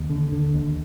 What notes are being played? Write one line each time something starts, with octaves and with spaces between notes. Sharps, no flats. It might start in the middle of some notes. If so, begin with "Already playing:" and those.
Already playing: D#2
D3
D3
D#2